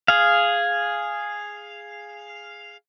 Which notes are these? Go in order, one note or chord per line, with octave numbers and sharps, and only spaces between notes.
G#4 F5